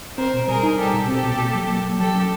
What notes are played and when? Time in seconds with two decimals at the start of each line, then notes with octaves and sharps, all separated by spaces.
0.18 C4 A#4 C5
0.33 B2
0.48 G3 G#4 A#4
0.63 D#4
0.78 G3 G4 A4
0.94 B2
1.08 C4 G4 A4
1.24 B2
1.39 A#3
1.55 F#3
1.69 A#3
1.85 F#3
1.99 F#3 G4 A4
2.14 C#4